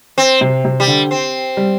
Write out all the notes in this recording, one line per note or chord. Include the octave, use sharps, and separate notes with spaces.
C4
C3
C3
G3
D3
C4
G3